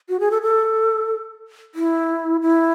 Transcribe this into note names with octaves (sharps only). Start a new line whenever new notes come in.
F#4
G#4
A4
A4
E4
E4